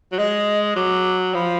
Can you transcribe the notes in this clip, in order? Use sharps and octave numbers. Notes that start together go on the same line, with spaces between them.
F#3
G#3 D#5
F#3 D6
F3 B5